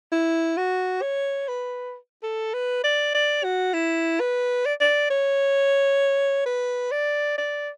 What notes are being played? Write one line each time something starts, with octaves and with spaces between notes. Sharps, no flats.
E4
F#4
C#5
B4
A4
B4
D5
D5
F#4
E4
B4
D5
D5
C#5
B4
D5
D5